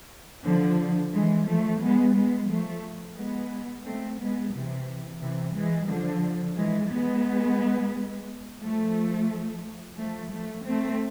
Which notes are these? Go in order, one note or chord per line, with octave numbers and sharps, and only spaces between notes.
D3 F3
E3 G#3
F3 A3
G#3 B3
G#3 B3
F3 A3
G#3 B3
A3 C4
G#3 B3
C3 E3
C3 E3
E3 G#3
D3 F3
E3 G#3
G#3 B3
F3 A3
F3 A3
F3 A3
A3 C4